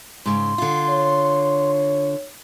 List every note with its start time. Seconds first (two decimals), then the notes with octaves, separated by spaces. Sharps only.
0.26 G#2 C#3 C6
0.58 D3 F4
0.90 C#5